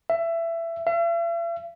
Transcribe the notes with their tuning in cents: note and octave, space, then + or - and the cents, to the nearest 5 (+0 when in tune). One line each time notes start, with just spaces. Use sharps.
E5 +20
E5 +45